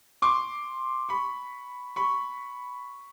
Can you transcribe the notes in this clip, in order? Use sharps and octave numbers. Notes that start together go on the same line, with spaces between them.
C6 D6
B5 C#6
B5 C#6